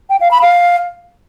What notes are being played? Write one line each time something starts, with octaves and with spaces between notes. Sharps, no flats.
G5
F5
B5
F5